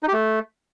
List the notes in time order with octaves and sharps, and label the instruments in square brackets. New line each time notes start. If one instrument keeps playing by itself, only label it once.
[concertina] D#4
G4
A3